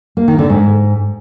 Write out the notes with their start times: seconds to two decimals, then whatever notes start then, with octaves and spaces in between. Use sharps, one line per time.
0.17 A#3
0.28 D#3
0.39 D3
0.49 G#2